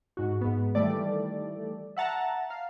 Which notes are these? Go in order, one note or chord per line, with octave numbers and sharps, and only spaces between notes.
G#2 F#4
G#2 B3
D#3 E3 G3 A3 D5
E5 F#5 A5 A#5
F5